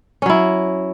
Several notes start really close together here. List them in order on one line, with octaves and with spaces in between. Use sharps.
C#4 F#3 E4